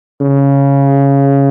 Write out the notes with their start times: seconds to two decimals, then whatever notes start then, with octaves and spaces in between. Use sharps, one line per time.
0.21 C#3